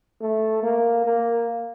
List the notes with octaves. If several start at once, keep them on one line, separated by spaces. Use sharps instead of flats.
A3
A#3
A#3